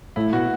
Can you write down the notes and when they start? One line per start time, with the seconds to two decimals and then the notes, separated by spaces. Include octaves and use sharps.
0.16 A2 E4
0.33 B2 F#4